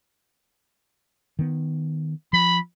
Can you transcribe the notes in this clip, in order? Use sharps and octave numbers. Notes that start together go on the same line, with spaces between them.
D#3 B3
F3 B5